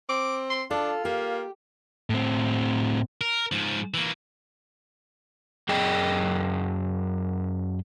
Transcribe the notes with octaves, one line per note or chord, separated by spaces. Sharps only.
C4 D6
C6
D4 F4 A4
A#3 G4
A2 C4
A#4
G#2 F3
E3 A#3
F#2 G#4 D#5 G5